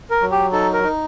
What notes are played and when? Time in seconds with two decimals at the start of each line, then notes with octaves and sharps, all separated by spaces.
0.11 A#4
0.22 F#3
0.32 G4
0.52 D#4 A4
0.73 A#4
0.84 D#4